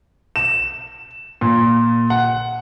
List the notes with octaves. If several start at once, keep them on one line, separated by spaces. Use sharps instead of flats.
E7
A#2
F#5